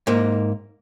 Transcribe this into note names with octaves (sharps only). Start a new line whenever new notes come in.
G#2 A#3